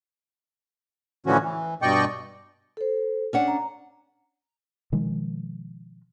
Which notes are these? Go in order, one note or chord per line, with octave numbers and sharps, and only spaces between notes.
A2 D3 E3 F3 C#4 F#4
E3
G2 B2 D5 D#5 G5 C#6
A4 C5
C#4 D4 F#5
A#5
B2 D#3 F3 G#3